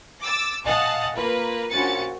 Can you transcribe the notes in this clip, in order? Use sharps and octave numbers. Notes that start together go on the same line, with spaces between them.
D6 E6 A6
D#5 F5 F#5 G#5 A5
A#3 F4 B4
A#1 C#4 F#4 A6 C#7